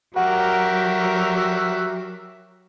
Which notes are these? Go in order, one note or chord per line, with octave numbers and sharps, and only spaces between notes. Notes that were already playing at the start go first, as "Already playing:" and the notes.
F#3 F#4 G4 A#4 E5 F#5